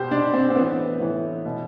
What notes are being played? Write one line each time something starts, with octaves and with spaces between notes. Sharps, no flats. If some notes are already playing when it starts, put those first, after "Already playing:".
Already playing: B2 G4 C5
B2 D4
C4
C4
A2 E3 B3
A2 E3
B2